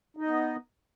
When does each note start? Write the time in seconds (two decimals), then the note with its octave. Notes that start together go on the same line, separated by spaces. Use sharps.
0.17 D#4
0.22 D#5
0.27 B3